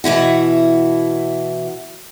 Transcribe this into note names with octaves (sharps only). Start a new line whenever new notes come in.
B2 E3 E4 F#4